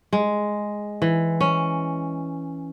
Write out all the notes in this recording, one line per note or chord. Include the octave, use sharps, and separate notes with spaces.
G#3
E3
C#4